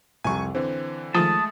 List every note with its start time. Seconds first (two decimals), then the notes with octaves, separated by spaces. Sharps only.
0.24 C2 F2 C3 G#5 C#6
0.55 D3 E3 C4
1.15 D#3 F3 G#3 A3 A5 D#6